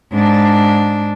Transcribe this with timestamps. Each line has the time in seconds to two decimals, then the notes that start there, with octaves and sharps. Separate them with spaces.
0.13 G#2 D4